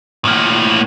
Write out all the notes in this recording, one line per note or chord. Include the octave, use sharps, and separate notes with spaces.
A2 A#3